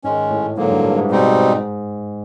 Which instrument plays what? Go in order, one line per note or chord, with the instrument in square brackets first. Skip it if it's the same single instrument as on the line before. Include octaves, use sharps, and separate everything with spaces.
[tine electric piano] G#2 [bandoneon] D#3 G#3 C#4
[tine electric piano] A2
[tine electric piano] G#2 [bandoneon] D3 F#3 A#3
[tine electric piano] G2
G2
G#2
[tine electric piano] G#2 [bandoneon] B2 G3 C4 D#4